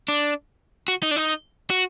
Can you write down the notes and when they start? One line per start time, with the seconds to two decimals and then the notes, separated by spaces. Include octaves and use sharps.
0.08 D4
0.88 F#4
1.03 D#4
1.11 D4
1.16 D#4
1.70 F#4